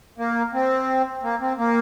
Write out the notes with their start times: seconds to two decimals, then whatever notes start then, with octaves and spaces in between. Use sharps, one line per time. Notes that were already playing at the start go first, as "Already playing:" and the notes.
0.18 A#3
0.53 C4
1.23 A#3
1.41 C4
1.58 A#3